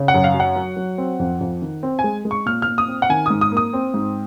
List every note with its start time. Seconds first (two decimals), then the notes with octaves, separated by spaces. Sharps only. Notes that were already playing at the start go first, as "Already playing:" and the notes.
Already playing: C#3
0.08 F#5
0.14 F#2
0.24 F5
0.34 F#3
0.40 F#5
0.56 F#3
0.77 F#3
0.98 C4
1.19 F2
1.41 F2
1.62 D#3
1.83 C4
1.99 G#5
2.04 G#3
2.25 G#3
2.31 C#6
2.46 A#2 F6
2.62 F6
2.68 A#2
2.78 D#6
2.88 C4
3.02 F#5
3.09 D#3 G#5
3.26 G#2 D#6
3.41 D#6
3.52 A#3
3.57 D#6
3.73 C4
3.94 G#2